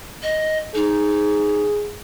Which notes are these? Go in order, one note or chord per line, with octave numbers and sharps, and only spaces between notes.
D#5
D#4 G#4